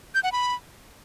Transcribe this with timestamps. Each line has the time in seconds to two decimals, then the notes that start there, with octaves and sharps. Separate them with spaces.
0.15 G6
0.23 F#5
0.32 B5